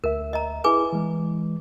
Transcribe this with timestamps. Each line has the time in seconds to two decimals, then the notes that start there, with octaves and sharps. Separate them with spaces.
0.04 D2 A#4 E5
0.33 D#5 A#5
0.64 E4 G#4 B4 G#5 D6
0.93 E3 G#3